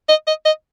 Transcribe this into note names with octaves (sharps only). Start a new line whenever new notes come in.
D#5
D#5
D#5